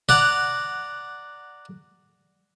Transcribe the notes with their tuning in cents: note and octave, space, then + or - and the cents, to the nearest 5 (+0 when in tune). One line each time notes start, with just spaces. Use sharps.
D5 +0 F#5 +0 A#5 -10